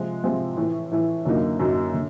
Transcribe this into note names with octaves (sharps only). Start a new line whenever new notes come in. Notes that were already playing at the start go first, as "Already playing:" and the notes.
Already playing: C3 F3 G#3 C4
C3 F3 G#3 C4
A2 E3 A3
A2 E3 A3
F#2 D3 F#3 A#3 D#4
F#2 D3 F#3 A#3 D#4
D3